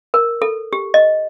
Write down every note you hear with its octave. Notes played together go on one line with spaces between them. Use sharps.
A#4
A4
G4
D#5